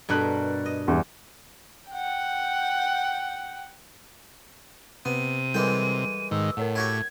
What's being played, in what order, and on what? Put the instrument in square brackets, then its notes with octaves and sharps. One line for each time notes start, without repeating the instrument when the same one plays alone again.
[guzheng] G2 B2 A#4 [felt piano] A4 A5 F#6
[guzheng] D#5
[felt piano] E2 G2
[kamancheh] F#5 G5
[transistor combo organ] C3 [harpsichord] B3 [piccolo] D#7
[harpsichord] E3 G#3 G5 [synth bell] G3 A4 A#4
[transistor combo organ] G#2 D#3 [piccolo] E6
[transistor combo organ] A2 [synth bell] A#4 C#5 F#5
[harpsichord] E4 F#4 G4 [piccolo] G#6